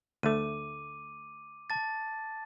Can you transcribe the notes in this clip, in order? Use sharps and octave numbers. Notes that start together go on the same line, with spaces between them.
D2 A3 D6 D#7
A5 A6